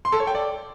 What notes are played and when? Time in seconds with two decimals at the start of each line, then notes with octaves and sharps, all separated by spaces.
0.05 C6
0.12 A4
0.20 C#5
0.27 G5
0.35 D5